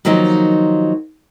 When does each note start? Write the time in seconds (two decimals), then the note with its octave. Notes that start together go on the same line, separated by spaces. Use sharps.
0.05 D#3 F3 F#3 A#3 D#4 F4